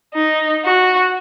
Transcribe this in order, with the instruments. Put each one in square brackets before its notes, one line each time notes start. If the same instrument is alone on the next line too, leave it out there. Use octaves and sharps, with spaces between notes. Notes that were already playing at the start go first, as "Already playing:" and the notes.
[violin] D#4
F#4